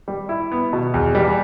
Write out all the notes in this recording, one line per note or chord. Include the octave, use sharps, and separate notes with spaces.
G3
E4
B3
B2
E2
G3